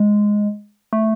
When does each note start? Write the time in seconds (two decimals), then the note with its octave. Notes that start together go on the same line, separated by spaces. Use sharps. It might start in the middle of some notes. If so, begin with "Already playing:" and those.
Already playing: G#3
0.93 A3